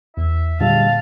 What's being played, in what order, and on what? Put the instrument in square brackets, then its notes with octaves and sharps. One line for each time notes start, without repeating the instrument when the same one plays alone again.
[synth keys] E2 [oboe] E5
[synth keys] A#2 [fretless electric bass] D3 G3 G#3 [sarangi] F5 [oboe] A5